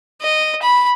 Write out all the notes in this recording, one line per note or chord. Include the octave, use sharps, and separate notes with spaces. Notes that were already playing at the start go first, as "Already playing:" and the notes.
D#5
B5